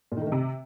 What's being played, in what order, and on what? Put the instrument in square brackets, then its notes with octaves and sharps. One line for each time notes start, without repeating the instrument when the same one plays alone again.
[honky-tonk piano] A#2
D#3
A3
D#3
C3